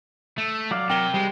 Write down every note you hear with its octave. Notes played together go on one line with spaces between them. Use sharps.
A3 E6
F#3 D5 F5
C3 A#4 G5 G7
G3 G#3 C5